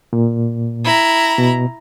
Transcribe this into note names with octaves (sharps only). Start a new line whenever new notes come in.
A#2
E4 A#5
B2